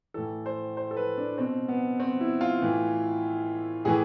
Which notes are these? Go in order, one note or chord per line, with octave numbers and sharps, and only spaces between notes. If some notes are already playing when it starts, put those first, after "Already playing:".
A2 E3 A4
C5
C5
A4
B4
D4
B2 C4
B3
C4
E4
F4
A2 E3
A2 E3 G#4